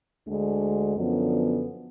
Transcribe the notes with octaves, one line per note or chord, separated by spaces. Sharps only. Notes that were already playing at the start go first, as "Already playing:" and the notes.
D2 D3 G#3
F#2 D3 F3 B3 D4